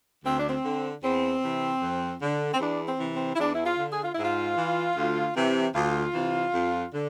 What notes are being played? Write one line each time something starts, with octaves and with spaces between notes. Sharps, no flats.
D2 C4
D4
C4
D3
E2 C4
C3 E3
F2
D3
C4
E2 D4
C4
C3 E3
C4
E4
E2 D4
E4
F4
D3
G#4
F4
G#2 E4
F4
E3
D2
C3 E3
D2 F4
C3 E3
F2
D3